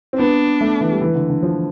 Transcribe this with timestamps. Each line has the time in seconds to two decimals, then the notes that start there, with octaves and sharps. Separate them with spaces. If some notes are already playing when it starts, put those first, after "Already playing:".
0.13 C4
0.18 B3 D4
0.61 A3
0.81 E3
0.92 G3
1.01 E3
1.15 D3
1.30 D3
1.43 F3